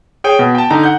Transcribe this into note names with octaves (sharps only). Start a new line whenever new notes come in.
G#4 C#5 G5
B2
G5 A5
D3 D#4 A#5
F#5 G6